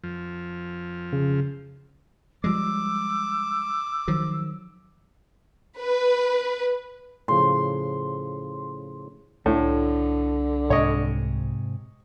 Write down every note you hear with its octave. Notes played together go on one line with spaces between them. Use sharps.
F2 F3
C#3
F3 G3 G#3 D6 E6
D#3 F3 F#3
B4
A2 C#3 F3 C6
C2 A2 D3
G#2 C3 C#5 D#5